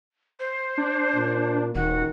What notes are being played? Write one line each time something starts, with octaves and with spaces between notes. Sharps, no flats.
C5
D4
A#2
D#1 D#3 F#4